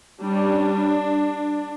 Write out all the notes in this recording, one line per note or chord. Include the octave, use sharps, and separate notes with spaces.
G3 C#4 D4